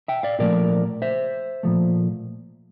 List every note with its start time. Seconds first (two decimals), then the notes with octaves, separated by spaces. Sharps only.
0.08 E5 G5
0.23 D5 F5
0.39 A#2 F3 A3 A#4 D5
1.02 C5 E5
1.63 A#2 F3 A3